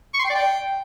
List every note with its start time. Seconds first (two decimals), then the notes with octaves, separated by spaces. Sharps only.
0.14 C#6
0.19 C6
0.24 G5
0.29 D5
0.34 G5